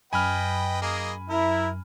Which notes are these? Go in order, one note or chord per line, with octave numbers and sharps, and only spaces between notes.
F#2 B4 D#5 G5 G#5 B5 F6
A#3 G#4 D#5
E4 A#4